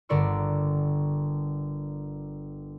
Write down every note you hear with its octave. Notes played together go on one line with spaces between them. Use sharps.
G1 D3 A#4 D5 C#6 E6